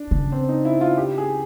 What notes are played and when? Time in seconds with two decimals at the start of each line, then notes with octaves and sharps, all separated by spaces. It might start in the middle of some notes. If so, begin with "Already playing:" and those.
Already playing: D4
0.11 C#3
0.32 C4
0.49 D#4
0.65 E4
0.81 F4
0.97 G4
1.18 G#4